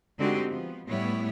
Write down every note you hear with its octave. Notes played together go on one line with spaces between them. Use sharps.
D3 G#3 C4 D#4 F#4 G4
F3 B3
A2 G3 B3 E4 C#5